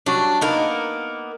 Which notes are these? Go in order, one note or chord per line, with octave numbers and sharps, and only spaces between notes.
F#3 G3 D4
A#3 B3 D#4 A#4